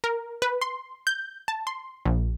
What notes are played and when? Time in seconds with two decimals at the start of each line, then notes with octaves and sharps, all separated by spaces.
0.04 A#4
0.42 B4
0.62 C6
1.07 G6
1.48 A5
1.67 C6
2.06 A#1